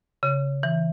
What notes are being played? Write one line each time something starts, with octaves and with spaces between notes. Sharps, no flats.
C#3
E3